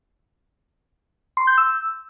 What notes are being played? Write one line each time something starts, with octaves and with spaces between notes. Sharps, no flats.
C6
G6
E6